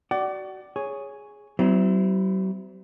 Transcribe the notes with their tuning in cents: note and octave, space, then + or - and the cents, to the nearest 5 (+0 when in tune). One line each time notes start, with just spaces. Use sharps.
F#4 +25 D5 +0 F#5 +40
G#4 +0 C#5 +0
F#3 +45 C4 -30 E4 +0